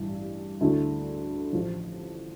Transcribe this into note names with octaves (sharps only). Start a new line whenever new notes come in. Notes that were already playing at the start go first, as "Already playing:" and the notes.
Already playing: A1 G2 E3
D2 D3 A3 E4
A1 A2 F3